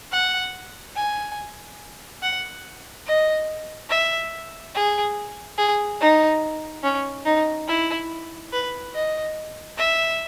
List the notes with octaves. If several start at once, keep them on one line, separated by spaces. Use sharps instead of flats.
F#5
G#5
F#5
D#5
E5
G#4
G#4
D#4
C#4
D#4
E4
B4
D#5
E5